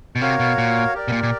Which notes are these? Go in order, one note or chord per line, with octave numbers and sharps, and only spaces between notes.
B2
C3 F#4 A#4 C#5 F5
B2
A#2
G4 A#4 D5
B2
A#2
A#2